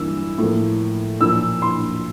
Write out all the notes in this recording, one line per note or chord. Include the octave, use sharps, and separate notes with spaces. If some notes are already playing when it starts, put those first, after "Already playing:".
Already playing: G2 E3 A#3 E6
A2 F3 A#3
A#2 F3 A#3 E6
C6